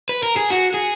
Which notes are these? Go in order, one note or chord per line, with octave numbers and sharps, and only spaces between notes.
B4
A#4
G#4
F#4
G#4